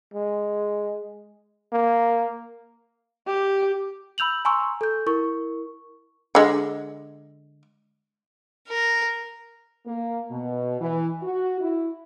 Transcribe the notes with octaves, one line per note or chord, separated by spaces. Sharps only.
G#3
A#3
G4
B5 E6 G6 F7 F#7
G#5 A#5 C6 C#6 E6
A4 G6
E4 A#4 C#6
D3 G#3
A#4
A#3
B2
E3
F#4
E4